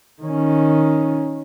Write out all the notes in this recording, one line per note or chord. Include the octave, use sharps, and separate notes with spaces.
D#3 C#4